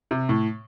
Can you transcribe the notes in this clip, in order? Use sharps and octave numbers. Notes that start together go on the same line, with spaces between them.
C3
A2